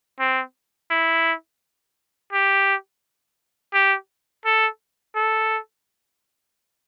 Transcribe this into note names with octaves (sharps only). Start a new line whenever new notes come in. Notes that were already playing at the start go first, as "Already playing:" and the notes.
C4
E4
G4
G4
A4
A4